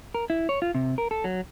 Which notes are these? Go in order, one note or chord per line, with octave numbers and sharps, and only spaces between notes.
A#4
E4
C#5
F4
C3
A#4
A4
F#3